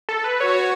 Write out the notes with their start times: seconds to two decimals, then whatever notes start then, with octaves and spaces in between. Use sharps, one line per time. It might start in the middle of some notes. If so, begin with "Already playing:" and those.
0.09 A4
0.24 B4
0.40 F#4 C#5